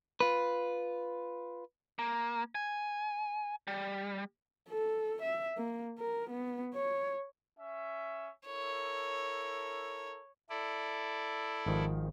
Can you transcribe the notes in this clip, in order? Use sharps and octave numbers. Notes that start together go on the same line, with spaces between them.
F4 B4
A#3
G#5
G3
A4
E5
A#3
A#4
B3
C#5
C#4 E5
E4 A4 A#4 C#5
E4 A4 D5
G#1 D#3 F3